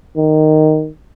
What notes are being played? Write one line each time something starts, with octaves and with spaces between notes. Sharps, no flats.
D#3